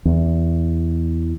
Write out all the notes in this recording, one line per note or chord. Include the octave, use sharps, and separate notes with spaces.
E2